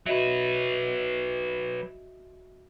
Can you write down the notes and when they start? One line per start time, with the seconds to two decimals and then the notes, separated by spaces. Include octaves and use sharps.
0.06 F#3 F#4 B4 D#5 E5